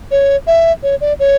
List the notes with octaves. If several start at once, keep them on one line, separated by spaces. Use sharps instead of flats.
C#5
E5
C#5
D5
C#5